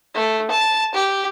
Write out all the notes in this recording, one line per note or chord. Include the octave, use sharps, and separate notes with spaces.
A3
A5
G4